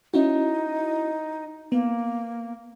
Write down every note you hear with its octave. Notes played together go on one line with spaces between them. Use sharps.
C#4 D#4 E4 F#4
A#3 B3